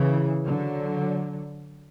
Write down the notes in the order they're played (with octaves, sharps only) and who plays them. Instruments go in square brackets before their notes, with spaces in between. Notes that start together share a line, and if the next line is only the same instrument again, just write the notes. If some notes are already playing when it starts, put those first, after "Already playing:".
Already playing: [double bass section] C#3 E3
D3 F#3